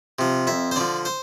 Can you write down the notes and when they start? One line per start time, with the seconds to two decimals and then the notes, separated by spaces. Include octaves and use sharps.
0.19 C3 F3
0.47 F2 E5
0.71 C5
0.76 D3 F3 D5
1.05 C5